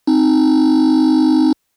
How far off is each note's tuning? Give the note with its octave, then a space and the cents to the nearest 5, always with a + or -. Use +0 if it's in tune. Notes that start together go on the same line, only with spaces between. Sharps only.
C4 +0 D#4 +0